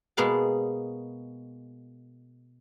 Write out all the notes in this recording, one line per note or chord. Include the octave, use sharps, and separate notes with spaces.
B2 G#3 A#3 G#4 A5